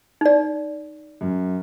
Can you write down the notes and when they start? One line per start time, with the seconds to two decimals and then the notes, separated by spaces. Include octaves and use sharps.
0.21 D#4 D5
1.21 F#2